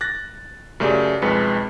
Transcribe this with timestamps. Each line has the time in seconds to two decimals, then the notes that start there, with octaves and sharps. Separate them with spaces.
0.01 F#6 A6 A#6
0.80 F#2 C#3 A3 G4 D5
1.22 B1 F2 G#3 B4 C#7